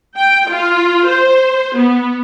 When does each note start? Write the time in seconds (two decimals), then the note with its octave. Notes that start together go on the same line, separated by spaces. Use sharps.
0.16 G5
0.49 F4
1.07 C5
1.75 B3